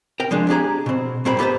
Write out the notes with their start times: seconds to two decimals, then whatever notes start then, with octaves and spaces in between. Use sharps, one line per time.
0.20 A#4 G5
0.31 F3 G#3 D4
0.49 D4 G4 G#4 A#5
0.86 B2 C4
1.25 G2 A#2 C4 A#4 B5
1.39 B3 G4 A4 B4 C5